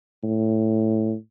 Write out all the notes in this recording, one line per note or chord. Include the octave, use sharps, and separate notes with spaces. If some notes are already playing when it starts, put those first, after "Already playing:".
A2